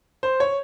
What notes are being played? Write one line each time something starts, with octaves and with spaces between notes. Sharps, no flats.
C5
C#5